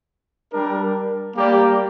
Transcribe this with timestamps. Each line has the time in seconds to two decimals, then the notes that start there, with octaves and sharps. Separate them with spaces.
0.53 G3 D4 A#4
1.35 G3 A#3 G4 D5